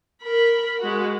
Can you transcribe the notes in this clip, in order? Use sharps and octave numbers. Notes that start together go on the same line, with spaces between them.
A#4 B5
G#3 F#4